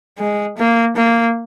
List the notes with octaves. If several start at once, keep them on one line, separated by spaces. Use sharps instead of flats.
G#3
A#3
A#3